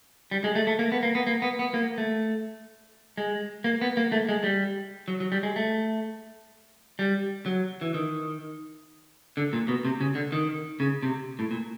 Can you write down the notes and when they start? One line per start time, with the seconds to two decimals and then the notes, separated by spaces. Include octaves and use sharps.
0.31 G3
0.44 G#3
0.55 A3
0.67 A3
0.79 A#3
0.92 B3
1.03 A#3
1.15 B3
1.27 A#3
1.42 B3
1.59 B3
1.74 A#3
1.98 A3
3.18 G#3
3.64 A#3
3.81 B3
3.97 A#3
4.12 A3
4.29 G#3
4.44 G3
5.08 F#3
5.20 F#3
5.32 G3
5.43 G#3
5.56 A3
6.99 G3
7.46 F#3
7.81 E3
7.94 D#3
9.37 D3
9.53 A#2
9.68 B2
9.85 C3
10.01 C#3
10.15 D3
10.32 D#3
10.80 C#3
11.03 C3
11.39 A2
11.51 A#2